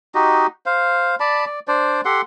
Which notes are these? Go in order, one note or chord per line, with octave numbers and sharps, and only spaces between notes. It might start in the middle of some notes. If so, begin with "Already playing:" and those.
D#4 F#4 G4 D#5
C5 F5
D5 A5 B5
D5
D4 C5 D5
G4 A4 F#5 C6